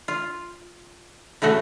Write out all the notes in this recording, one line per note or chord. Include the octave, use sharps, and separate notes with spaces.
F4
A2 C#3 A3 F#4